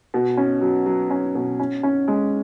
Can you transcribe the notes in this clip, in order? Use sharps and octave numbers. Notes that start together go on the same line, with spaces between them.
B2
C#4
F#3
F#3
C#4
B2
C#4
C#4
G#3